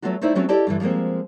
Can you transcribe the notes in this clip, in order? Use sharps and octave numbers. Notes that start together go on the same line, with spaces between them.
F#3 G#3 A3 B3 F4 F#4
A3 D#4 E4 C5 D5 E5
F#3 A3 C4 C#4 F4 F#4
E4 G4 A4 D5 D#5 A5
G2 D3 E3
F3 G3 G#3 A#3 C4